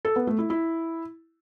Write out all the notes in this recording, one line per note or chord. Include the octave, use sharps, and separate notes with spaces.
A4
B3
A3
E4
E4